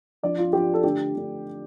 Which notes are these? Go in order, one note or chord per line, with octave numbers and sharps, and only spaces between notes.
F3 D4 D5
F4
F3 D4 G4
A4
D3 A3 D4 G4
D3 A3 D4